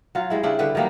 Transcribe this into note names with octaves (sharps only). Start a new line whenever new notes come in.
F#3 F4
G3 G#3 E4
C#3 G3 D4 E4
D3 G3 B4
D#3 F#3 G3 A#3